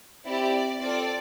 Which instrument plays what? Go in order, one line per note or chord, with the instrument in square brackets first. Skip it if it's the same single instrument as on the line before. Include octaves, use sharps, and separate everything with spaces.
[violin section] C4 E4 G4 D5
C4 F4 A4 D5